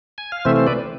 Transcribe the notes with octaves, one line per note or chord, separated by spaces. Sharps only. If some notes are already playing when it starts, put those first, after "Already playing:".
G#5
F5
C3 E3 A3 C4 C5 E5
C5
B4 D5